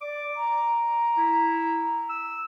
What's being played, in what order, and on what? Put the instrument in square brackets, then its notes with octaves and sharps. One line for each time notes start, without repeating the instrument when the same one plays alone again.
[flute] D5 [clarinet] D6
[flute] A#5
[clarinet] E4
E6